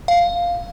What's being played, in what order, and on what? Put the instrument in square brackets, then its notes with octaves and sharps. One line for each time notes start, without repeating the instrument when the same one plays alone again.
[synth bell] F5